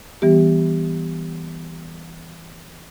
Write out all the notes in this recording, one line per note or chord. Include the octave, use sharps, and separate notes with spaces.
E3 G3 B3 G4